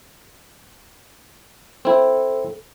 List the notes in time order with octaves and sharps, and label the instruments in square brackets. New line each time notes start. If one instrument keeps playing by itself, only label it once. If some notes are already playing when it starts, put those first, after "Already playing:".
[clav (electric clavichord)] C4 E4 [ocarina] A4